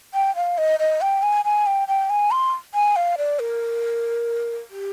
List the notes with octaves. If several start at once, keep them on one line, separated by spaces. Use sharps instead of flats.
G5
F5
D#5
D#5
G5
G#5
G#5
G5
G5
G#5
C6
G#5
F5
D5
A#4
G4